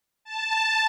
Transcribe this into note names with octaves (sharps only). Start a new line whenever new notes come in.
A5